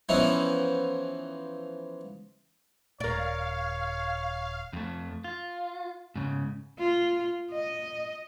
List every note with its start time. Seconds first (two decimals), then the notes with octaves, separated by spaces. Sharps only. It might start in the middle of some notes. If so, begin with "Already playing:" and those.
0.09 E3 F3 B3 C#4 D#4 E4
3.00 D#1 A#4 C#5 D5 F5
4.73 F2 A3
5.24 F4
6.15 G#2 C#3
6.79 F4
7.52 D#5